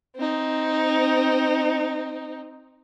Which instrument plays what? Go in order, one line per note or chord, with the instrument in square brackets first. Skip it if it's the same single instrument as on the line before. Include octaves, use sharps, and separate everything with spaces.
[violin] C4 D#4